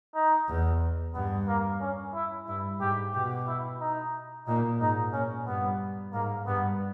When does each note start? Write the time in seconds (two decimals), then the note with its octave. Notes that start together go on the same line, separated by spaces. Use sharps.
0.15 D#4
0.48 E2
1.14 G2 B3
1.47 A#3
1.81 C#4
2.14 E4
2.47 G2 E4
2.80 G#2 G4
3.13 B2 G4
3.48 E4
3.80 D#4
4.47 A#2 D#4
4.80 G#2 D#4
5.13 A#2 C#4
5.47 G2 B3
6.13 G#2 A#3
6.47 G2 B3